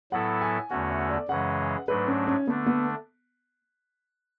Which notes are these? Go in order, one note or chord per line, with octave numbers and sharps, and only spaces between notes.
A2 F#3 B3 E4 A4 F#5
G#5
E2 D3 A3 C#4 F#4 F#5
E5
D5
F#2 C#3 E3 G#3 C#4 F#5
G#2 F#3 A3 D4 B4
C#4
C#4
D3 A3 B3 D4
B3